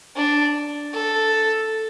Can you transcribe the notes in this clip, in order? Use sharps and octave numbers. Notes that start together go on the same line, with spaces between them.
D4
A4